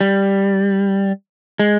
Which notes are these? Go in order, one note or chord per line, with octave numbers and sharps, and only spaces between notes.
G3
G#3